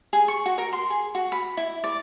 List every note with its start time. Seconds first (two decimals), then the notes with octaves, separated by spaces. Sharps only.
0.13 G#4
0.28 C#6
0.46 F#4
0.58 A#4
0.73 C6
0.90 G#4
1.15 F#4
1.32 B5
1.57 E4
1.84 D5